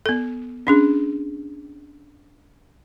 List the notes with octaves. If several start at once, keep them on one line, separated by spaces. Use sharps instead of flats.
B3 A4
C#4 D4 G#4